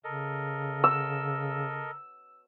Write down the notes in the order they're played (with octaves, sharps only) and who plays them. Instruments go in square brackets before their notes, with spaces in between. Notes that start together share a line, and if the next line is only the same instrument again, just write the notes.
[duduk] C#3 [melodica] A4 A#4 D#5
[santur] E6